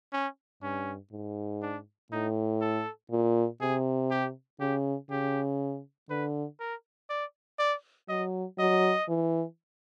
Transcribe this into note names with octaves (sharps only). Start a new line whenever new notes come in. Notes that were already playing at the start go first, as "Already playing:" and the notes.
C#4
G2 C#4
G#2
D4
A2 D#4
A4
A#2
C3 G#4
G4
C#3 G4
C#3 G4
D3 B4
A#4
D5
D5
F#3 D#5
F#3 D#5
E3